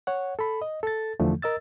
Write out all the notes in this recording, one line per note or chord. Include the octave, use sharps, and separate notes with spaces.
C#5 F#5
A4 B5
D#5
A4 A6
E2 D3 E3 F3 A3
A#4 D#5 E6 A6